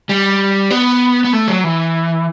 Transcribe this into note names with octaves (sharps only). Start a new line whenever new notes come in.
G3
B3
B3
A3
F#3
E3